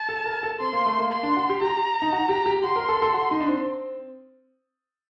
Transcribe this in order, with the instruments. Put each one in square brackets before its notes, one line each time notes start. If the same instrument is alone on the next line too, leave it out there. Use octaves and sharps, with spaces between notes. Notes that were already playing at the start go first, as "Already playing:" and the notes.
Already playing: [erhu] A5
[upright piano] A4
A#4
A4
[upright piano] C4 [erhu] C6
[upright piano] A#3
A3
A#3
[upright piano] A#3 [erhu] C6
[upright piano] D4
F#4
G4
[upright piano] G4 [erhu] A#5
[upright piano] D#4
F#4
G4
G4
[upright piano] F#4 [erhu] C6
[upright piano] A#4
A4
A4
F#4
D#4
D4
C4